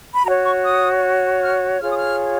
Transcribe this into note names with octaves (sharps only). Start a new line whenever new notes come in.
B5
F#4 C#5 A#5
C#6
D#6
F6
F4 G#4 C#5 F6
D#6
F6